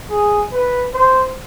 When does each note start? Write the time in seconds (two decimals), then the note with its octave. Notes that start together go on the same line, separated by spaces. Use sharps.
0.10 G#4
0.52 B4
0.94 C5